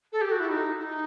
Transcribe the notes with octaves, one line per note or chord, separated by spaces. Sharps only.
A4
G4
F#4
E4
D#4
E4
D#4